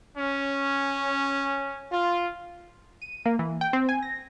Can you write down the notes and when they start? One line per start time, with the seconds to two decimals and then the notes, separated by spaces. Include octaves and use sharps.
0.18 C#4
1.92 F4
3.02 D#7
3.26 A#3
3.39 E3
3.61 G5
3.73 C4
3.89 G#5
4.03 A#6